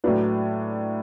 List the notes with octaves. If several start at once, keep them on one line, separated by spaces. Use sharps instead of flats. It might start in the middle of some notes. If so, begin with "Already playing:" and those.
A2 F#3 D4 B4